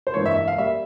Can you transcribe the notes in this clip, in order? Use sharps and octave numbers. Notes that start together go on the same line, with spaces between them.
C5
G2 E3 A#3 C#5
E5
E5
F5
G3 A#3 E5